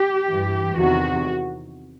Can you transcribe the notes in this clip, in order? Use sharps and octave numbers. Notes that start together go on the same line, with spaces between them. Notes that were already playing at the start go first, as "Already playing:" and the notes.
Already playing: G4
G2 E3
E2 C3 D#3 F#4